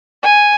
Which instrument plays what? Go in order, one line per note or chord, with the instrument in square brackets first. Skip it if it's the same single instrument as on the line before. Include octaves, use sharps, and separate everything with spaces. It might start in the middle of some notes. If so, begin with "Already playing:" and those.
[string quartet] G#5